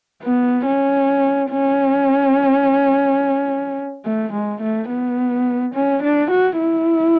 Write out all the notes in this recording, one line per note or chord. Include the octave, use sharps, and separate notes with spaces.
B3
C#4
C#4
A3
G#3
A3
B3
C#4
D4
F#4
E4